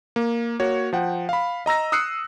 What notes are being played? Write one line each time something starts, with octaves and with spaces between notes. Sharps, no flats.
A#3
A#3 F#4 C#5
F3 F#5 G5
F5 B5
D#5 A#5 E6 A#6
D#6 E6 F#6 C7 C#7